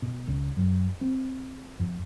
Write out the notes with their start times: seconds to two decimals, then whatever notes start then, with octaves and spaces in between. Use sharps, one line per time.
0.02 B2
0.27 C#2
0.57 F#2
1.01 C4
1.79 F2